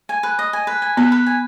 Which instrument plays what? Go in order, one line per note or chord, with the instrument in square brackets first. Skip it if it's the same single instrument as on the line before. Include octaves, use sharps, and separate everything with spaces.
[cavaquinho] G#5
B4
D#5
G#5
B4
G#5
[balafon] B3 [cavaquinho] B4
[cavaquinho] B4
G#5